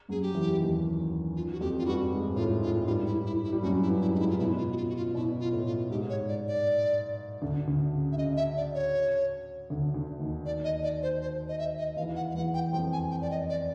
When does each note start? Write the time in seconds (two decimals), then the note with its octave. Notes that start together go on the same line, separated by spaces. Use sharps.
0.08 F#2 F#3 G#4
0.22 G4
0.34 E2 E3
0.59 D#2 D#3
1.36 F4
1.52 F#4
1.61 F2 F3 G4
1.79 F4
1.86 G2 G3 F#4
2.11 G#2 G#3
2.36 A2 A3 F4
2.62 G#2 G#3 F4
2.87 G2 G3 F4
3.06 E4
3.26 E4
3.44 E4
3.52 G3
3.63 F#2 F#3 F#4
3.82 E4
3.88 G2 G3
4.01 E4
4.13 G#2 G#3 D#4
4.19 E4
4.30 F4
4.39 B2 B3 E4
4.58 F4
4.72 F#4
4.77 F4
4.89 F#4
4.96 F4
5.14 B2 B3 E4
5.40 F4
5.52 A2 A3
5.65 F4
5.90 G#2 G#3 G4
6.09 C#5
6.28 D5
6.48 D5
7.42 D2 D3
7.67 D2 D3
7.93 C#3
8.12 E5
8.18 C#3 D#5
8.37 E5
8.57 D5
8.75 C#5
9.70 D2 D3
9.94 D2 D3
10.20 D#2 D#3
10.46 D5
10.64 D#5
10.83 D5
11.02 C5
11.22 C5
11.49 D#5
11.59 E5
11.78 D#5
11.97 E2 E3 F5
12.16 F#5
12.31 F5
12.35 E2 E3 F#5
12.54 G5
12.73 F2 F3 G5
12.93 G#5
13.11 G5
13.21 D5
13.30 D#5
13.50 D5